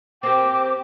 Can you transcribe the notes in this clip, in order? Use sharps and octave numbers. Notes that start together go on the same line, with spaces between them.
C4 G4 A#4 D6